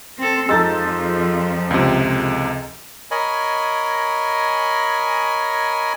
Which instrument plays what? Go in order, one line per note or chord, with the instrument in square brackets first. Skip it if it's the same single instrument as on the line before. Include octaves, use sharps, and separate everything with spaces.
[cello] C4 A4
[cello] F2 F3 [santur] G#3 D#4 A4 [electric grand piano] E6 A6
[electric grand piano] C#2 C3
[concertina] A#4 C#5 D#5 G#5 B5